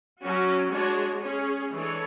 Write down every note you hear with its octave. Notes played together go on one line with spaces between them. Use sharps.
F#3 C#4 F#4
G#3 D4 F#4 C#5
C#4 G#4 C#5
E3 G#3 D4 A4 C#5